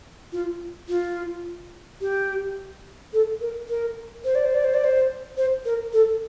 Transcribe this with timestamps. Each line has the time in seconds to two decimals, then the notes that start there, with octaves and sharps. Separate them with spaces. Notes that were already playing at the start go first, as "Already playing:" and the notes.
0.33 F4
0.89 F4
2.01 G4
3.13 A4
3.41 A#4
3.69 A#4
4.25 C5
4.35 D5
4.45 C5
4.54 D5
4.64 C5
4.74 D5
4.84 C5
5.37 C5
5.65 A#4
5.93 A4